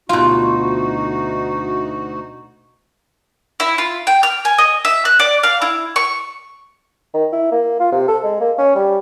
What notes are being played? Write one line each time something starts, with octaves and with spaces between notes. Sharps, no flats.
D2 B2 D#4 F4 F#4
E4
F4
G5
F6
G#5
D#5
E5
F#6
D5
F5
E4
C#6
D#3
E4
A#3
F4
C3
A4
G#3
A#3
C#4
G3